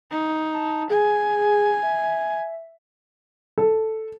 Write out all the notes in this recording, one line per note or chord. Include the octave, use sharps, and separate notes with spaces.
D#4
A5
G#4 G#5
E5
A4